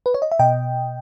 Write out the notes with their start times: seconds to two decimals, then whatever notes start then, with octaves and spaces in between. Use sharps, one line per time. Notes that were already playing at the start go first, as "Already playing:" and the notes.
0.06 B4
0.14 C#5
0.22 D#5
0.32 E5
0.39 B2 D#5 G5